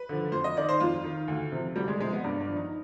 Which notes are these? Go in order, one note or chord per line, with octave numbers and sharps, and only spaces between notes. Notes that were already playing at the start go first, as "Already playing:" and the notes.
Already playing: B4
D3 F3
F2 C5
D#5
D#3 D5
C5
F2 F4
D#3
D2
C3 F3
D2 G3
G#3
C3 F3 G#3
B3
G2 D4
D4
F3
D#4